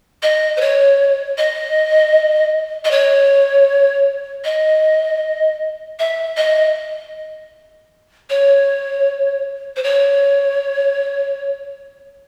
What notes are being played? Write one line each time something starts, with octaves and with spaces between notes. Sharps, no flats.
D#5
C5
C#5
D#5
D#5
C#5
D#5
E5
D#5
C#5
C5
C#5